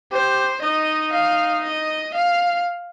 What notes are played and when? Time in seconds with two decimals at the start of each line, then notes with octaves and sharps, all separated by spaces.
0.12 G4 C5
0.62 D#4 D#5
1.12 F5
1.64 D#5
2.14 F5